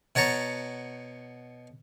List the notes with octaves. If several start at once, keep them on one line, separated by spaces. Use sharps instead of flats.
B2 C#5 F#5 A5 A#5 C#6